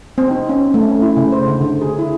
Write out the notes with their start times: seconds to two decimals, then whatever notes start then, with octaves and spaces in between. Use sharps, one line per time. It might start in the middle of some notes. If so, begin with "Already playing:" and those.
0.18 C4
0.31 D#4
0.49 C#4
0.74 A3
0.88 C#4
1.02 E4
1.17 C#3
1.32 C5
1.48 D3
1.61 D3
1.81 G#4
1.99 E4